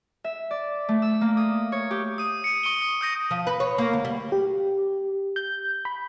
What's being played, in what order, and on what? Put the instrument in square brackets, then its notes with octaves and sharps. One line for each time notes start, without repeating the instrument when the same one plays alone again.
[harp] E5
D5
A3
E6
A#3
D#6
C#5
G4
[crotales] D#6 D#7
C#7 D#7
C#6 D#6 D7 D#7 G7
D#6
D#6 G6 A#6 D#7
[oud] F3
B4
C#5
A#3
D2
G3
[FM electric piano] G4
G6
B5